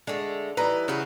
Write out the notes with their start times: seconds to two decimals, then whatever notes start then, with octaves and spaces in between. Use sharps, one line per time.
0.07 D3 G#3 A3
0.57 E3 G3 D#4 B4 A#5
0.88 C#3 F#4 B4